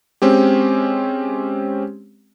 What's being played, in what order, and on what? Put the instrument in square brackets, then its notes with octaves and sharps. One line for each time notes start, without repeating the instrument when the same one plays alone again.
[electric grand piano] G#3 C4 C#4 G4